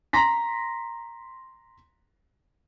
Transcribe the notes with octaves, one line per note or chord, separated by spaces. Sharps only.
A#5 C6 A#6 B6